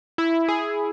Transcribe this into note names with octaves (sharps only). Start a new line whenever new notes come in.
E4
E4
G#4
G#4